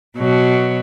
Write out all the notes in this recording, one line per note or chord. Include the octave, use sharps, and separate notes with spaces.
B2 F#3